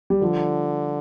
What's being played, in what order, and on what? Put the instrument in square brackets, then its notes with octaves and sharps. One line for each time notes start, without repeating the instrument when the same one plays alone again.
[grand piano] G3
[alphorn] D3 [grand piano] F3